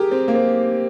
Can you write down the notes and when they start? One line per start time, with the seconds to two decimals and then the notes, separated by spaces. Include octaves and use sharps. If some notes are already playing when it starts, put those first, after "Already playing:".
Already playing: G4 G#4 A#4
0.11 C4
0.28 A#3
0.35 C4